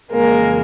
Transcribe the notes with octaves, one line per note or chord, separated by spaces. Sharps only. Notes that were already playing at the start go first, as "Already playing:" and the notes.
F2 C#3 E3 G#3 A#3